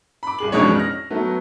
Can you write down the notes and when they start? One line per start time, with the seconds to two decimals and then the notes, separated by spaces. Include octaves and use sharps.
0.23 B5 D6
0.38 C2 G#4 F#7
0.52 A1 F2 B2 G#3 D4 C#5
0.75 F6 A#6
1.10 F#3 A3 B3